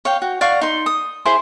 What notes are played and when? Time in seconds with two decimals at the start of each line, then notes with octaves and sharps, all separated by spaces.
0.05 C#5 F5 G5
0.22 F#4
0.41 D5 F5 F#5 C#6
0.61 D#4 C6
0.86 D#6
1.25 E4 G#4 C5 C6